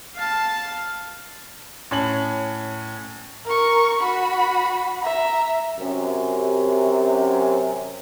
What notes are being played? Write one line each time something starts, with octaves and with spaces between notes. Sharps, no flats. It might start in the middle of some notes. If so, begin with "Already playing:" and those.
F5 A5
A2 C#4 F#7
A#4 C#6
F#4 B5
E5 A#5
F#2 C3